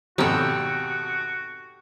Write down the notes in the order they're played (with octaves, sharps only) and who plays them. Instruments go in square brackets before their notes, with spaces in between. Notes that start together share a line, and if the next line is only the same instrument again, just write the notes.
[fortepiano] G#1 F2 B2 [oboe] F#4 [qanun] G4 A4